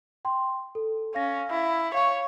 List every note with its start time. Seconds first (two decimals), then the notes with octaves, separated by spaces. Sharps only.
0.25 G5 C6
0.75 A4
1.15 C#4 F5 A#6
1.51 E4
1.94 C#5 F5 C#6